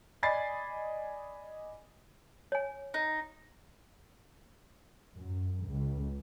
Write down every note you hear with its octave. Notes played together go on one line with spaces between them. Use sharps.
D5 D#5 G#5 B5 A6 C7
C#5 G#5
D#4
F#2
C#2